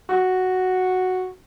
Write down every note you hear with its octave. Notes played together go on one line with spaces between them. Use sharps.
F#4